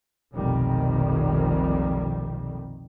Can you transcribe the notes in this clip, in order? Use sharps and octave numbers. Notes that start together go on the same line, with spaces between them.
F1 B1 F2 D#3 G3 A#3